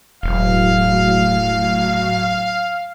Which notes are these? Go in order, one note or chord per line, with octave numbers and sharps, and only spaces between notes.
E1 A2 F#3 F5